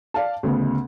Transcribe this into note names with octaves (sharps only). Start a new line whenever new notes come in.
D5 F5 A5
D2 C#3 B3